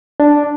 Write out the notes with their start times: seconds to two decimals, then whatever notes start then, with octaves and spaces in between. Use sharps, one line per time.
0.20 D4